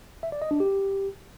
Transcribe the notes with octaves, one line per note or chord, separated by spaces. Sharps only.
E5
D5
D#5
D4
G4